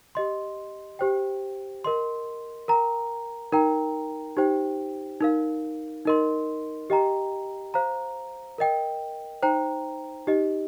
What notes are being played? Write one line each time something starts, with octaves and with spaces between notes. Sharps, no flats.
G4 D#5 C6
G4 C5 G5
A#4 D#5 C6
A#4 G5 A#5
D#4 A#4 G5 A#5
D#4 G4 C5 G5
D#4 A#4 F5
D#4 A#4 D#5 C6
G4 D#5 G5 A#5
C5 F5 A#5
A#4 D#5 G5
D#4 C5 G5 A#5
D#4 G4 D#5